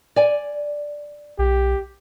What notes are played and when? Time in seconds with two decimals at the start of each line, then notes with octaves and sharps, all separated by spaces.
0.16 D5 G#5
1.39 B1 G4